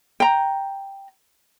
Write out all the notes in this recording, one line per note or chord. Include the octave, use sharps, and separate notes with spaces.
G5 A#5